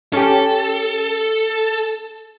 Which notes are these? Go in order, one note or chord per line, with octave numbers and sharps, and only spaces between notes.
C#4 G4 A4